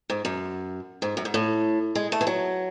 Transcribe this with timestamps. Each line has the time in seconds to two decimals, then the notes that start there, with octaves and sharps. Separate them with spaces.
0.10 G#2
0.25 F#2
1.02 G#2
1.17 F#2
1.25 G#2
1.34 A2
1.95 G#3
2.12 A3
2.21 E3
2.27 F#3